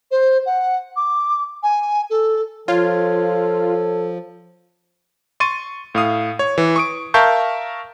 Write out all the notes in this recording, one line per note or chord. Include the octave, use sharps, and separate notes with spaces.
C5
F#5
D6
G#5
A4
F3 F4 A4 C#5 G#6
C6 C#6 A6 D#7
A2 F5 D#6
C#5
E3
C#6 D#6 D7
A#4 E5 F5 A5 C#6 G6